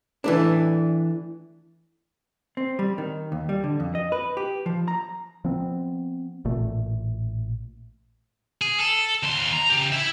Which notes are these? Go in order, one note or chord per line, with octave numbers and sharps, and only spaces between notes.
E3 A3 D4
C4
G3
D#3
D#2
G3
D3
F2
D#5
B4
G4
F3
A#5
F3 B3 C4
A1 A#2 A3
G#4
A4
D#2 C6
A#5
C#3 G4
E4 E5